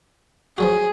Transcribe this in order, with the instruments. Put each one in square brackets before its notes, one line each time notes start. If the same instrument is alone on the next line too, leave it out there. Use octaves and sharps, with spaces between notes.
[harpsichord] F3 F#3 F#4 [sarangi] G#4